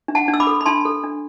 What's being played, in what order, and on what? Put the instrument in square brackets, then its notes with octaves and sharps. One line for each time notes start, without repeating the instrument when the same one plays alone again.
[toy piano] D4
F#5 A5
D4
E6
B5 D6
A4
B5
D4 A5 C6
A4
D4